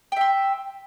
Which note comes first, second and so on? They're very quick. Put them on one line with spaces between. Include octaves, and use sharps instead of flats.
G5 E5 C6